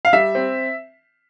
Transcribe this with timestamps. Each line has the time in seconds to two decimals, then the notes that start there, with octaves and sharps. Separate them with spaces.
0.05 F5
0.13 G3 E5
0.35 C4